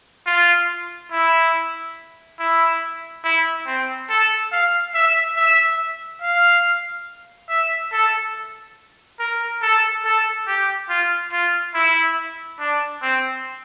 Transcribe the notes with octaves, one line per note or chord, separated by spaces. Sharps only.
F4
E4
E4
E4
C4
A4
F5
E5
E5
F5
E5
A4
A#4
A4
A4
G4
F4
F4
E4
D4
C4